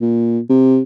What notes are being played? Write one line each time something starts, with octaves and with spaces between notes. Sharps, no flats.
A#2
C3